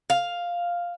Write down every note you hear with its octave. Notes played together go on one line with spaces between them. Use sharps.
F5